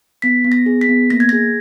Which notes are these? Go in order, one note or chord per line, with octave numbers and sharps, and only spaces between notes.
B3 B6
B3
A#6
G#4
B6
B3
A#3 A#6
G#6
G#4 A#6